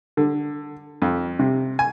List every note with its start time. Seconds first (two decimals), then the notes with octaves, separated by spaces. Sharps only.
0.17 D3
1.02 F2
1.39 C3
1.79 G#5